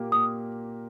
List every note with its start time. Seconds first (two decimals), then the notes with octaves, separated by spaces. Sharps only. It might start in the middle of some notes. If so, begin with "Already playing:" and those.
Already playing: A#2 A#3 G4
0.12 A#2 D#6